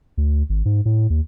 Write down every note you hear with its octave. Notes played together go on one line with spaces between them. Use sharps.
D2
G#1
G#2
A2
D#2